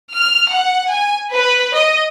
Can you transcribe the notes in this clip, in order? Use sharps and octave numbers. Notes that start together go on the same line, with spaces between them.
F6
F#5
G#5
B4
D#5